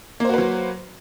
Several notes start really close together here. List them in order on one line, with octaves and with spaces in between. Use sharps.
A#3 C5 F#4 B4 F#3